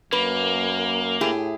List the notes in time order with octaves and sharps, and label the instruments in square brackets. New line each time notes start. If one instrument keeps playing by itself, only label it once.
[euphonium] F#2 [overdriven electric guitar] A#3 [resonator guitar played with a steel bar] B4
[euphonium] A2 [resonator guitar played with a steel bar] E4 G4 G#4